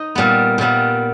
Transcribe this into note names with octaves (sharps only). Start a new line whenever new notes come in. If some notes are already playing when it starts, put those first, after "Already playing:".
Already playing: D#4 D#5
A#2 G3 B3
A#2 G3 B3